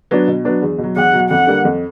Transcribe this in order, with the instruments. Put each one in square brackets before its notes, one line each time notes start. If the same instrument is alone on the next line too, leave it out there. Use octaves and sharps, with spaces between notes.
[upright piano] F#3 B3 D4
B2
F#3 B3 D4
E2
B2
F#3
[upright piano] E2 [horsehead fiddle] F#5
[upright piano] B2 F#3
[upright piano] F2 [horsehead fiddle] F#5
[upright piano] D3 G3 A#3
F2